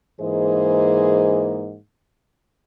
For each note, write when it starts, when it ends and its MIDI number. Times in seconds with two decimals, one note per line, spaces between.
0.21 1.76 44
0.21 1.76 52
0.21 1.76 58
0.21 1.76 68
0.21 1.76 72
0.21 1.76 75